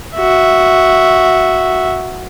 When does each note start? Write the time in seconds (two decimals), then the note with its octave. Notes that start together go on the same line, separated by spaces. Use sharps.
0.16 F#4 E5